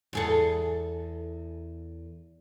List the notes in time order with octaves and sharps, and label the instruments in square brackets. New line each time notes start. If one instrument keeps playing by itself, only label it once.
[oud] E2 G#4 A4